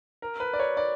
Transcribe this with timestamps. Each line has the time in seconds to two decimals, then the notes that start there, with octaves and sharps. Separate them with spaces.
0.22 A#4
0.40 B4
0.54 D5
0.60 C#5
0.77 D5